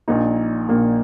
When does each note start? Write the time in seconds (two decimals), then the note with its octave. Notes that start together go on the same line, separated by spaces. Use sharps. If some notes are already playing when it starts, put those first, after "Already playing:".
0.08 A#1 A#2 A#3 D#4
0.69 A#1 A#2 A#3